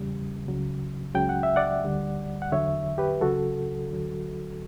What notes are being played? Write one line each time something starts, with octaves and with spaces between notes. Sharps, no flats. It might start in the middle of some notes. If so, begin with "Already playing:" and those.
Already playing: E2 C#3 G3
C#2 C#3 F#3
C#2 C#3 F#3 G5
F#5
E5
D5 F#5
D2 D3 G3
F#5
E2 D3 F#3 C#5 E5
G4 B4
C#2 C#3 F#3 F#4 A4
D2 D3 F#3